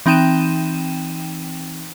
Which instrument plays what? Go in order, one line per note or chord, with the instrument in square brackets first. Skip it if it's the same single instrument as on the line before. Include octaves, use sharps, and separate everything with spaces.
[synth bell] E3 C4 D#4 G5 D#7 E7